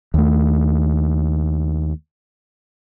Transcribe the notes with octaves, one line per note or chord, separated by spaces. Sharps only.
D#2 A3